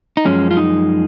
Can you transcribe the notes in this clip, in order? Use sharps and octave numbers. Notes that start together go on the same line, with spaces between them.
D#4
F#2 F3 G#3 C#4
F4
D#4